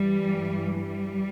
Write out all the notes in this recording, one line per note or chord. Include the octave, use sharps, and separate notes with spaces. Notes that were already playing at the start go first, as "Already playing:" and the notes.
Already playing: G2 E3 G3
G3